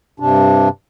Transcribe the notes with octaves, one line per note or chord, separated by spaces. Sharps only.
G2 C3 D4